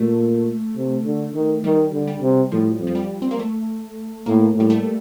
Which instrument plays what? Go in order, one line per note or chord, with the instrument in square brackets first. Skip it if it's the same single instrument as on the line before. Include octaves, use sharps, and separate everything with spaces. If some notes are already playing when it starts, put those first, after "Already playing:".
Already playing: [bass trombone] A#2 [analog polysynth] A3
[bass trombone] C3
D3
D#3
[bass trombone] D#3 [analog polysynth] G3
[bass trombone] D3
[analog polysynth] G3
[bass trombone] C3
[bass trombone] A2 [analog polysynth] F3
[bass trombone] F2
[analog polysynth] F3
G3
C4
A#3
A3
[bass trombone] A2 [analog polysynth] A#3
[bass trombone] A2 [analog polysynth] G3
[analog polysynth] A3